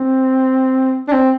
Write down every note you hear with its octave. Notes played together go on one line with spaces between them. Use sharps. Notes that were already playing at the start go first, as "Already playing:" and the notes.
Already playing: C4
D4
C4